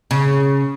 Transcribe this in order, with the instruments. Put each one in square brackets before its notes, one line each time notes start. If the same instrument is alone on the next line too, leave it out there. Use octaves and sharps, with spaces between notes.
[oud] C#3